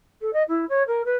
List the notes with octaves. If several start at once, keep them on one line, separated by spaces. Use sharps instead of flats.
A4
D#5
E4
C#5
A#4
B4